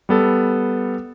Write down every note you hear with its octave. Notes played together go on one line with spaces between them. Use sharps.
G3 B3 A4